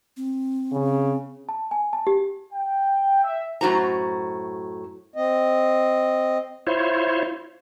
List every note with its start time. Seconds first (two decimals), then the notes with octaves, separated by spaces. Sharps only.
0.17 C4
0.72 C#3
1.49 A5
1.71 G#5
1.93 A5
2.07 G4
2.52 G5
3.23 E5
3.61 F#2 A2 F#4 C5 A#5
5.16 C4 D#5
6.67 E4 F4 C5 C#5